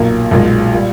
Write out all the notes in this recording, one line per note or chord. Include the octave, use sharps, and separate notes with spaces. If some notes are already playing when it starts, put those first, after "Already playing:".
Already playing: B1 A#2 A#3
B1 A#2 G#3
A#2 G3